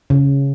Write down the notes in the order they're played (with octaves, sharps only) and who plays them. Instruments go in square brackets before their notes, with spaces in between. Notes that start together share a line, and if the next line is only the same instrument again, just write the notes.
[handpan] C#3